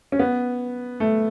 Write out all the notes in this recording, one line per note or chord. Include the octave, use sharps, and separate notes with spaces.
C#4
B3
A3